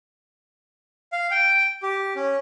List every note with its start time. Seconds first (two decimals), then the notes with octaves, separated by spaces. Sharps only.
1.12 F5
1.31 G5
1.83 G4
2.16 C#4